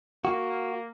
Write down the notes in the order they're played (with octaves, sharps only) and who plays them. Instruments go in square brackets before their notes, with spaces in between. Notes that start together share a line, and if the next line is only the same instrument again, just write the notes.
[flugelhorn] A#3 [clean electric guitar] F#4